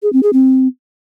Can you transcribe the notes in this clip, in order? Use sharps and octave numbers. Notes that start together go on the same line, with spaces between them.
G#4
C4
G#4
C4